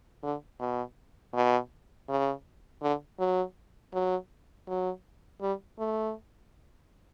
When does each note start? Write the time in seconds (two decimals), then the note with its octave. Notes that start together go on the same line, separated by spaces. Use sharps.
0.23 D3
0.60 B2
1.34 B2
2.09 C#3
2.82 D3
3.19 F#3
3.94 F#3
4.68 F#3
5.42 G3
5.79 A3